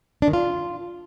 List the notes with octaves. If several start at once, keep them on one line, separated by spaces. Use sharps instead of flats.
D4
D#3
F4